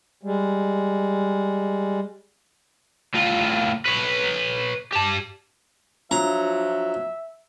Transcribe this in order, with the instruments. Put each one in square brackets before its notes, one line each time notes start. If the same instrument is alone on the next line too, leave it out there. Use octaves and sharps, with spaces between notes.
[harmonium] G3 G#3
[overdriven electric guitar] A2 F4
B4 C#5
G4 A5
[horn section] F3 F#3 [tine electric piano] D4 F4 [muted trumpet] E5 [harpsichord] A#5